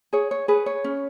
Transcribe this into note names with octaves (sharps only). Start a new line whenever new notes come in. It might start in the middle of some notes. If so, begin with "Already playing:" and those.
G#4 C#5
C#5
G#4 B4
C#5
C#4